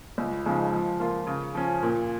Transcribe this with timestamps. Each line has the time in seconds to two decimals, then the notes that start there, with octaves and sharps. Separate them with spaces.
0.18 C#2
0.46 C#3 F3 G#3 D#4
0.73 F3
1.00 A#3 F4
1.27 C#3
1.55 F3 C#4
1.83 A#2